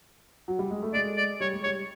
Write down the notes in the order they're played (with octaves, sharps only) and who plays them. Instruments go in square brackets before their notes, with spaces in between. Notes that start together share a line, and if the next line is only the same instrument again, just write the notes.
[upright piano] F#3
G3
G#3
A3
[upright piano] G#3 [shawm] D5
[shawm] D5
[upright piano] G3 [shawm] C#5
[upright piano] G#3
[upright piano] G3 [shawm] C#5